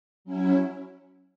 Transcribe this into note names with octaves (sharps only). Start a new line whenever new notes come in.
F#3 C#4 E4